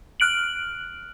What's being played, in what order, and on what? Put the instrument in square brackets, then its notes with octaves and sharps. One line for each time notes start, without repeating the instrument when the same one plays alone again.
[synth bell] F6 F#6 D7 F#7